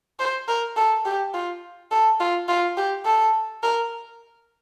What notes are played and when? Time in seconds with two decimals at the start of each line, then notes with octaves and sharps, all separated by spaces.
0.20 C5
0.48 A#4
0.77 A4
1.06 G4
1.34 F4
1.91 A4
2.20 F4
2.49 F4
2.78 G4
3.06 A4
3.63 A#4